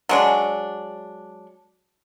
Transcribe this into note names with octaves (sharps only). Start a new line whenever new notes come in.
F#3 G#3 D4